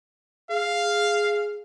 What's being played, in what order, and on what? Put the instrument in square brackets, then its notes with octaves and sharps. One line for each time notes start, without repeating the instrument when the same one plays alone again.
[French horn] G#4 [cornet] F5